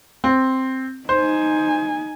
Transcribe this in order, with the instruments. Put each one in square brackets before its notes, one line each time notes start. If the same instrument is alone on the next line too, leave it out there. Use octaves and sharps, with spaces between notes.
[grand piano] C4
[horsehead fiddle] D#4 G#5 [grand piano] C5